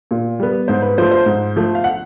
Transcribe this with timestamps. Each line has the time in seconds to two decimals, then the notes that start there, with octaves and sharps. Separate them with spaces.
0.11 A#2
0.39 G3 B3
0.68 G#2 C5
0.82 B4
0.98 F3 A3 C5
1.11 C5
1.26 G#2
1.56 F3 A3
1.75 F5
1.84 F#5